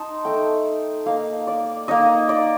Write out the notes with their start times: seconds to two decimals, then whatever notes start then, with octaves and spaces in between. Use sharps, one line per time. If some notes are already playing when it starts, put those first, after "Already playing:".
Already playing: D#4 A5 C6
0.25 A3 D#4 G5
1.06 A#3 D#4 F5
1.47 D5
1.88 A#3 D#4 D#5
2.29 D5